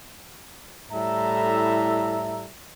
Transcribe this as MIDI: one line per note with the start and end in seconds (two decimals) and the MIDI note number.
0.92 2.45 45
0.92 2.45 55
0.92 2.45 64
0.92 2.45 69
0.92 2.45 76
0.92 2.45 82